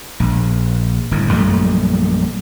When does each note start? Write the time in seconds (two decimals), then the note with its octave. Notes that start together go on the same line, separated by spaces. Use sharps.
0.20 A#1
1.11 G1 A2
1.31 A#1 F#2 G3 A3